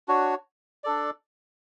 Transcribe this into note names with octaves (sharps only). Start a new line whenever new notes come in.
D4 F#4 C#5
D4 A4 D5